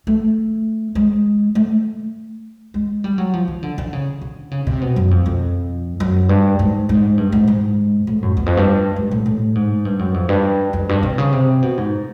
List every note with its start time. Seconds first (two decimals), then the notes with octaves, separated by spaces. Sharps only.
0.07 A3
0.95 G#3
1.55 A3
2.74 G#3
3.04 G3
3.18 F#3
3.33 F3
3.48 D#3
3.63 D3
3.78 D3
3.93 C#3
4.21 D3
4.51 C#3
4.67 C3
4.81 B2
4.96 F#2
5.11 F2
5.26 F2
6.00 F#2
6.29 G2
6.59 G#2
6.89 G#2
7.18 G2
7.32 G#2
7.48 G#2
8.07 A2
8.22 F#2
8.37 E2
8.46 F2
8.57 G2
8.96 G#2
9.11 A2
9.26 A2
9.55 G#2
9.85 G2
9.99 F#2
10.14 F2
10.29 G2
10.73 F2
10.89 G2
11.03 C3
11.18 C#3
11.32 C3
11.62 B2
11.77 G#2